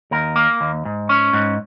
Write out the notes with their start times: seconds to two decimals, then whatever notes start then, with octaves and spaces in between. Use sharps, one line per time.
0.11 D#2 A#4
0.36 A#3
0.61 D#2
0.85 G#2
1.09 C#4
1.33 G#2